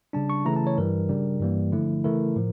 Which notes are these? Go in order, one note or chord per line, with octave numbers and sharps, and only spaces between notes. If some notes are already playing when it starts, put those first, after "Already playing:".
C#3 G3 D4 A5
C#6
C#3 E3 A3 E4 A#5
A5
C#5
G2 E3 G3 A#4
C#3 G3 D4
G2 E3 G3 A#3
D3 F3 A3 E4
C#3 E3 A3 E4 A#4
A2 F3